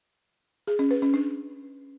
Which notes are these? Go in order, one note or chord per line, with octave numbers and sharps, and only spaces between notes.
G#4
C#4
B4
C#4
D4